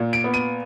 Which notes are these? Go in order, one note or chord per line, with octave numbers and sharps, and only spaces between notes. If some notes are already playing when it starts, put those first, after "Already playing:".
Already playing: A#2
D7
B3
D#7